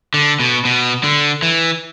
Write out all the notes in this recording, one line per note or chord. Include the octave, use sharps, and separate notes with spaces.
D3
B2
B2
D3
E3